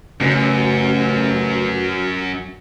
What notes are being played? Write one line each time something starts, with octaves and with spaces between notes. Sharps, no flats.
A1 F#2 C#3 F#4